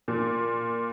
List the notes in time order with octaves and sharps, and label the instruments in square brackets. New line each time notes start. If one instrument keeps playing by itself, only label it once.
[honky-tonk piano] A#2